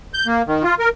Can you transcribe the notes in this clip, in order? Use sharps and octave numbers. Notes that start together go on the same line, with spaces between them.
G6
A#3
D#3
F4
A#4